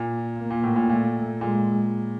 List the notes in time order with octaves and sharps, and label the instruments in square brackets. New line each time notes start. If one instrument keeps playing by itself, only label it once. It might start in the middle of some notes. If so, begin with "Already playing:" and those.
Already playing: [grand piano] A#2
[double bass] A#3
[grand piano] A#2
A2
A#2
[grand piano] A#2 [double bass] A3
[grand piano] A#2 [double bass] G#3